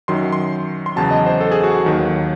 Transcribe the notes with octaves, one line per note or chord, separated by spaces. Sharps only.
F#2 D#3 F#3 C6
C6
C6
E2 C#3 F#3 A5
D#5
C5
A4
G#4
F#4
D#2 D#3 F#3